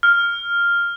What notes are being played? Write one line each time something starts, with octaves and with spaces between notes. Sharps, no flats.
F6